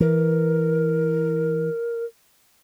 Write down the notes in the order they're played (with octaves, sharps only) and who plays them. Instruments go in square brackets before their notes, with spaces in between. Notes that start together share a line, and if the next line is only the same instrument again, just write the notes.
[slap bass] E3 [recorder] A#4